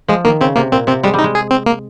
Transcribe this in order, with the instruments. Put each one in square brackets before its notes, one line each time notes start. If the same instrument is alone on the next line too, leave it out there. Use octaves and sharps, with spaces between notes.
[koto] F3 [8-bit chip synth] G#3
[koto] D#3 [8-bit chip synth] A#3
[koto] C#3 [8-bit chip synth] C4
[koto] C3 [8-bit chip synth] A#3
[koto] A#2 [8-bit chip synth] C4
[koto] C3 [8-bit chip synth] C4
[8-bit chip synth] G3 [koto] G#3
[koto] G3
[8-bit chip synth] D#4
[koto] G#3
[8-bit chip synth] G#4
C4
A#3